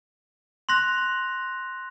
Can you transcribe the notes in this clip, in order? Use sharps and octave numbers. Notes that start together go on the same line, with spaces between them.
C6 F#6 A#6 F7